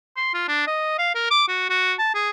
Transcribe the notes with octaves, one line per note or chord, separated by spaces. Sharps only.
C6
F4
D4
D#5
F5
A#4
D6
F#4
F#4
A5
G#4